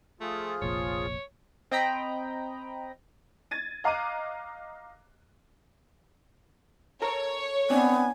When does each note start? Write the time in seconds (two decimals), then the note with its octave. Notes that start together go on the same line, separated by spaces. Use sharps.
0.21 F3 A3 F4 G#4
0.62 F1 A#1 A#2 C#5
1.71 C4 D#5 G5 A#5 B5
3.51 G#6 A6 D#7
3.84 D#5 F5 A#5 D6 F#6 D#7
7.02 A4 A#4 C#5 A#5
7.70 B3 C4 D4 G#5